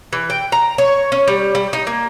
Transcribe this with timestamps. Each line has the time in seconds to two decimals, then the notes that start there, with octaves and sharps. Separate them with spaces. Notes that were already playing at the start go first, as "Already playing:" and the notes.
0.13 E3
0.30 G5
0.52 A#5
0.78 C#5
1.12 C#4
1.28 G3
1.55 G3
1.73 D#4
1.87 A#3